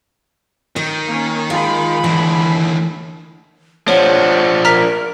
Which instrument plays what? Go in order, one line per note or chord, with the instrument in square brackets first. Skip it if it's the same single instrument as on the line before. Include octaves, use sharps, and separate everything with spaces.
[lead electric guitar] D#3 [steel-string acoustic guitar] D#5
[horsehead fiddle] A#3 C#4
[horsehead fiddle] G#3 B5 [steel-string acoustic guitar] F4
[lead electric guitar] D#2 D3 [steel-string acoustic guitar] E3
[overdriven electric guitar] F3 D4 [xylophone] C#5 [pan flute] F#5
[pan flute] A#4 [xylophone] A#5 F6 B6